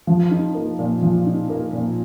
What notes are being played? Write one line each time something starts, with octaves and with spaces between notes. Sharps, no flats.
F3
D#4
A#3
A#2
F3
D#4
A#3
A#2